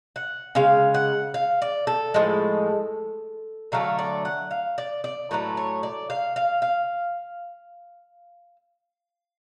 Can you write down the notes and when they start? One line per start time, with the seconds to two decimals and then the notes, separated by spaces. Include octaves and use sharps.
0.16 F#5
0.55 C#3 G#3 F5
0.94 F#5
1.34 F5
1.62 D5
1.87 A4
2.14 A2 F3 G#3
3.72 D3 F#3 A3 F5
3.99 D5
4.25 F#5
4.51 F5
4.78 D5
5.04 D5
5.31 A2 F#3 A3 B4
5.57 C#5
5.83 D5
6.10 F5
6.36 F5
6.62 F5